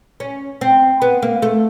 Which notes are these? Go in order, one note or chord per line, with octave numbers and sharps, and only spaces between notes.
C#4
C4
B3
A#3
A3